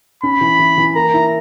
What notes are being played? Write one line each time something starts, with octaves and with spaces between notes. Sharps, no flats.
C#4 B5
E3
E3
E3
A#3 A#5
E4